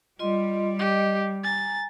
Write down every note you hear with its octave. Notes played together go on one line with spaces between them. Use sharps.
G3 F4 D#5 C6
G4 D#5
G#5 A#5 A6